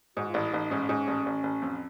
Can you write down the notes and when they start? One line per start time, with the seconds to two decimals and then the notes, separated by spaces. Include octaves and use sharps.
0.17 G#2 F#4
0.29 F4
0.34 A1 E4
0.52 A1 D#4
0.71 G#2 C#4
0.89 G#2
1.07 A1
1.26 A1
1.43 A1
1.62 F2